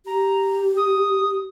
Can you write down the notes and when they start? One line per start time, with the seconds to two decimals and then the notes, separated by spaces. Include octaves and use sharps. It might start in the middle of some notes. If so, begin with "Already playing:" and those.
0.06 G4 A#5
0.77 D#6